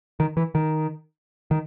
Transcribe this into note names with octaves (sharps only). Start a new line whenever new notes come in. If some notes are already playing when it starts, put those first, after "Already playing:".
D#3
E3
D#3
D#3